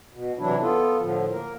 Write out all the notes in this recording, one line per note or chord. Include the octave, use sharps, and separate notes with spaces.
B2
C3 E3 F#3 D4 E4
B3 F4 A4
A2 D3 F3
A#3 A#4